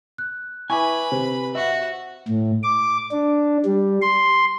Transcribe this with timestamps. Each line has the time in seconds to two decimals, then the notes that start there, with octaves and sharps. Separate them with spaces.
0.18 F#6
0.70 E4 B4 G#5 B5 C#6 D6
1.12 C3 C5
1.55 F#4 E5
2.29 A2
2.63 D6
3.12 D4
3.65 G3
4.02 C6